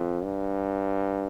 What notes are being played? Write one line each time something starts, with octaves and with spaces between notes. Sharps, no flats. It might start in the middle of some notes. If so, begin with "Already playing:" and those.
Already playing: F2
G2